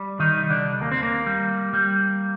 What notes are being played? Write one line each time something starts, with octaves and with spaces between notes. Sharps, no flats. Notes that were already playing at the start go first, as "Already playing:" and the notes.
Already playing: G3
D#3 D#4
C2
D3 D4
D#2 A#3
C4
A#3
G3
G3